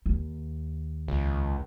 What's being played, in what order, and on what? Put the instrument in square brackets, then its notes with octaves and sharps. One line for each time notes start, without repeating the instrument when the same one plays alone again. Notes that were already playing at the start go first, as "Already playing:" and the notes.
[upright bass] D#2
[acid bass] C#2